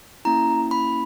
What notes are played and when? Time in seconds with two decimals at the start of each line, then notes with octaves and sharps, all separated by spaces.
0.25 A#3 C#4 E4 A#5
0.71 B5